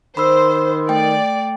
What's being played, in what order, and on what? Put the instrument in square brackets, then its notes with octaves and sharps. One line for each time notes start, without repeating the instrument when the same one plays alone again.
[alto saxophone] D#3 [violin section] C5 [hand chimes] B5 C6 E6
[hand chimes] A3 G5 [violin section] D5